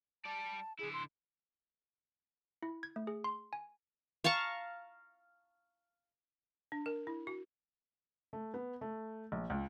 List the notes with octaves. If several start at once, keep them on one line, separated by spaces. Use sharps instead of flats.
G3 D5 A5
D3 E4 G#4
C6
E4
G#6
A3
G#4
C6
G#5
F5 A5 A#5 C#6
D4
A#4
E4
F#4
A3
B3
A3
A#1
C#2